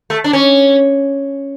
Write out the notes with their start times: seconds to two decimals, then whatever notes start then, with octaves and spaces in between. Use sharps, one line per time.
0.10 A3
0.24 D4
0.33 C#4